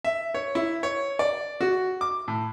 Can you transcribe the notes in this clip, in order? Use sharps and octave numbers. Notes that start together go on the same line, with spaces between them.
E5
C#5
E4
C#5
D5
F#4
D6
A2